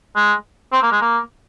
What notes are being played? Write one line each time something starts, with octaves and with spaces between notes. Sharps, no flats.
G#3
C4
A#3
G#3
A#3